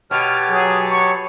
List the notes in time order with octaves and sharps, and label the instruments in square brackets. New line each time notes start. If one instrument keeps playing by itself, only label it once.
[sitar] B2 [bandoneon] G4 C#5 A5 [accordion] F6
[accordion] F#3 [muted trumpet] G#4
[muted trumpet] C#6